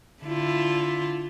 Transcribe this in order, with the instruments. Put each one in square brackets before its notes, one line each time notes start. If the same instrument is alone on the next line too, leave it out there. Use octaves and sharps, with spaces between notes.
[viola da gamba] D3 E4 F4